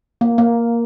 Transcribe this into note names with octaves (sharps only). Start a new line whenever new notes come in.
A#3
A#3